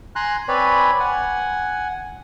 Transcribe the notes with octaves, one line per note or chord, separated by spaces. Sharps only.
G#5 A#5 C6 F#6
C4 B4 C#5 D5 G#5 B5
F#5 G#5